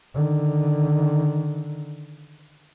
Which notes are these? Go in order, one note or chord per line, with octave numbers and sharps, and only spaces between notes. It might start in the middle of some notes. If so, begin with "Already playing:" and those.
D3 D#3